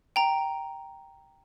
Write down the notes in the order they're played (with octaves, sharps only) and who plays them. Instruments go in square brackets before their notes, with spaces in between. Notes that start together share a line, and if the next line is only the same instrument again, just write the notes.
[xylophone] G5 A#5